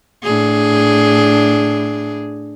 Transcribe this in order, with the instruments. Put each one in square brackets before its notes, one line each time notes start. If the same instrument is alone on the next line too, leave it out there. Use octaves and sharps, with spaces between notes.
[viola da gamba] A2 D4 G#4